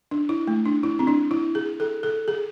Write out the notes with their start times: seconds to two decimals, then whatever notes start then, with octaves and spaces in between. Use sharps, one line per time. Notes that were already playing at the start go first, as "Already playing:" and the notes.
0.11 D4
0.29 E4
0.47 A3
0.65 D4
0.83 E4
0.99 C4
1.07 D4
1.31 E4
1.55 G#4
1.80 A4
2.03 A4
2.28 G#4